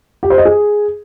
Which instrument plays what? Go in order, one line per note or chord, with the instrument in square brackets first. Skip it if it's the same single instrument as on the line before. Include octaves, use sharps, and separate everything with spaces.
[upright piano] G4
C5
D#5
G#4